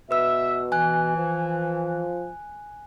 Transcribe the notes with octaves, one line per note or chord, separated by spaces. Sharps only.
B2 B4 E5 E6
E3 G#5 F#6
F3